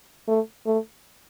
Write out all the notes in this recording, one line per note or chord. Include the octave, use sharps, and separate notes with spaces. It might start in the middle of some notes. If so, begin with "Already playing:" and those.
A3
A3